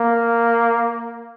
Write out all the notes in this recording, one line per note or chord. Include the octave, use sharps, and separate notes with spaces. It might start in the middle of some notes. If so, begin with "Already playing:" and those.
Already playing: A#3